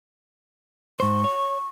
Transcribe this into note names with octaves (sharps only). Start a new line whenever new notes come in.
G#2 C5 C#6
C#5